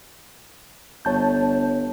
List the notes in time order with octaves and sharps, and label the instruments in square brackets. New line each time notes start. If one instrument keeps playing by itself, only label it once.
[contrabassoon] G1 [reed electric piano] C#5 A5 G6